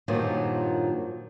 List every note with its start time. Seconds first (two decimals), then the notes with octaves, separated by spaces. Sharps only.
0.08 G2 A#2 D#3 F3 F#3